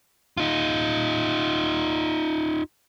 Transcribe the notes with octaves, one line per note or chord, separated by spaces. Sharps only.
D#4 F4